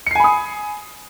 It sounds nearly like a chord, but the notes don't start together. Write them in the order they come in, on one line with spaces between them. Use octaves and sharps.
C#7 C7 G#5 B5 D#6